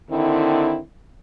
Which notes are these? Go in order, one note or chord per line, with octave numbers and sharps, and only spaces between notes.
D3 D#3 C4 E4